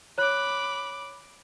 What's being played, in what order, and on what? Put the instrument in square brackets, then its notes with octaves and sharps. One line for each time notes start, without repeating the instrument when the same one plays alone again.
[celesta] C#5 F#6 [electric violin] B5 D6